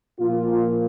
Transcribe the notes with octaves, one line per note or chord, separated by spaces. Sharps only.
A#2 F3 A#3 F4